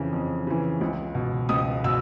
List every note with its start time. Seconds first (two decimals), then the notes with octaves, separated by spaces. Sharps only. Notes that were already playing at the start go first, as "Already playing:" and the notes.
Already playing: F2 C#3 E3
0.13 F2
0.47 C#3 E3
0.81 C#2
1.15 B2
1.49 C#2 D#6
1.84 B2 E6